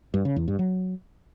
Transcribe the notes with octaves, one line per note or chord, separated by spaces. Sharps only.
G2
C#3
E2
G2
F#3